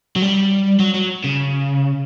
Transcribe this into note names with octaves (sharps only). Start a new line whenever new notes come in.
F#3
G3
F#3
F#3
C#3